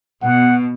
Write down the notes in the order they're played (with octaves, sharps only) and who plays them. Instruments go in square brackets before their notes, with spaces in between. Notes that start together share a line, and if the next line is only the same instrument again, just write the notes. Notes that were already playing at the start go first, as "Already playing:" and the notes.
[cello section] B2 [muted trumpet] F#5